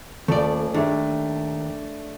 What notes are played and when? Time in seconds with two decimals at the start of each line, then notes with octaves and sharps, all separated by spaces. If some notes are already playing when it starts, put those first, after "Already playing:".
0.28 D#1 A3 D5
0.74 D#2 A3 D4